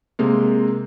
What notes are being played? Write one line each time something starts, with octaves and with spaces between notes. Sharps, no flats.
C3 G#3 A#3